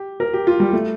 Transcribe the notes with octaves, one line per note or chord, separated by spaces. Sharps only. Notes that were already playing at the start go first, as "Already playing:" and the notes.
Already playing: G4
A#4
G4
F4
G3
A3